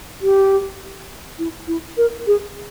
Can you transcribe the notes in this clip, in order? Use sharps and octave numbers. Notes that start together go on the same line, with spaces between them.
G4
E4
E4
A#4
G#4